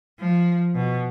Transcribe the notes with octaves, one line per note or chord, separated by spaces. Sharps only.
F3
B2